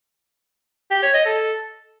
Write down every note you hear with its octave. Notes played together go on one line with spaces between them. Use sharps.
G4
C#5
D#5
A4